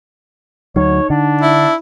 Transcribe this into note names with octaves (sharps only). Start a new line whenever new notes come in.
D2 F#3 D#4 C#5
D3 D4
E4